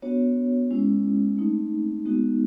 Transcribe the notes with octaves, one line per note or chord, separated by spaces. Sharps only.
B3 D4 F#4 C#5
G#3 C#4 E4
A3 C4 D#4
G#3 B3 D#4 F#4